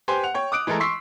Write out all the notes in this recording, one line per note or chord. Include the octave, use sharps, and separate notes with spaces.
G4 B4 C5 G#5 C6
F#5 F7
C#5 G5
D6 D#6 F#6 D7
E3 G#3 A3 A4 A#4
C6 C#6 E6 B6 C7